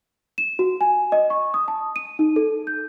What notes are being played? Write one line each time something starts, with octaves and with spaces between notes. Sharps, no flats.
E7
F#4
G#5
D#5
C#6
D#6
A5
D#7
D#4
A4
G6